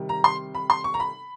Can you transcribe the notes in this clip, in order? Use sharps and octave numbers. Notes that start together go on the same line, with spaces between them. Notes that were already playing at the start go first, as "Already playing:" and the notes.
Already playing: C3 D#3 G3
A#5
C6
B5
C6
C#6
A#5
B5